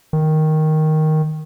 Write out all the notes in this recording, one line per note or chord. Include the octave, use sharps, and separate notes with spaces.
D#3